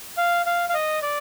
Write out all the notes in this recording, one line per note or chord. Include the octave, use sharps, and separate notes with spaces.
F5
F5
F5
D#5
D5